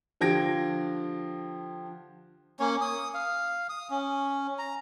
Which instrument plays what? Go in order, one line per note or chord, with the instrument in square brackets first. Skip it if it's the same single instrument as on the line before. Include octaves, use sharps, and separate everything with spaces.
[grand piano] D3 F3 G4 G#6 A#6 D7
[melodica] A#3 C#4 C#5
D#6
F5
D#6
C#4
A#5